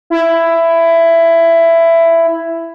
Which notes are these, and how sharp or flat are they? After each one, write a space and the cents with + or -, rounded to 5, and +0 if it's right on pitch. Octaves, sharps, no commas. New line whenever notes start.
E4 +10